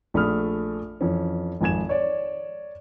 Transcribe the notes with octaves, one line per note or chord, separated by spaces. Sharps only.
A#1 A3 D5 B5 D#6 F6
F2 E3 C#4
G#1 F2 G#5 G#6 E7
C#5 D5